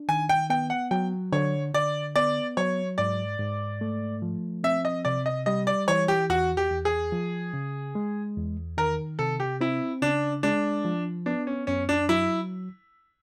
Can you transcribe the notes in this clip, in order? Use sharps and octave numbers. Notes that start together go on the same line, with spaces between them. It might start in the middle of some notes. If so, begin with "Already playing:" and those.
Already playing: D4
D#3 G#5
G5
B3 G5
F#5
F#3 G5
D3 C#5
D3 D5
B3 D5
F#3 C#5
G#2 D5
G#2
A3
F3
C4 E5
D#5
C3 D5
D#5
G3 D#5
D5
E3 C#5
G4
E2 F#4
G4
E2
G#4
F3
C#3
G#3
E2
D#3 A#4
C3 A4
G4
C4 E4
C#3 D4
G#3 D4
F3
B3 D4
C#4
F#2 C#4
D4
F#3 E4